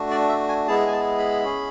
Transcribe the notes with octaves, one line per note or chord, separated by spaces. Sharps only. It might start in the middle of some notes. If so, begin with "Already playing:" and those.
Already playing: A3 D4 F#4
D5
E5
G#5
G#3 B3 E4 G#4 A5
G#5
A5
B5
C#4 G#4